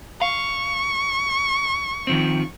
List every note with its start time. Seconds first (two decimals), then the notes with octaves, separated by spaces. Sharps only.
0.21 F5 C#6
2.07 D#3 F3 C4